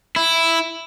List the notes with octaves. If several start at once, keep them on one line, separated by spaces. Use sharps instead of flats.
E4